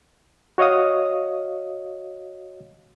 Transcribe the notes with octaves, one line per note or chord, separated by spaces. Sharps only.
F#4 C#5 D#5 F5 D#6